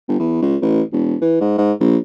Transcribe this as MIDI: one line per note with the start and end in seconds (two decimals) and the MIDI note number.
0.08 0.16 31
0.19 0.39 40
0.42 0.57 37
0.62 0.82 33
0.93 1.16 28
1.21 1.36 52
1.41 1.56 44
1.58 1.73 44
1.80 1.97 34